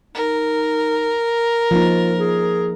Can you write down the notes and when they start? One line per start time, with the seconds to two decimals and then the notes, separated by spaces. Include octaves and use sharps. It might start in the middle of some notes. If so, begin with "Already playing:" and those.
0.15 D#4 A#4
1.71 F3 A#3 D#4 F4
2.19 G#4